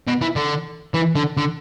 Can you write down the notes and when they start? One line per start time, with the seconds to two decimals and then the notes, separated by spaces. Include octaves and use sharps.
0.07 B2
0.21 E3
0.36 D3
0.94 E3
1.16 D3
1.37 D3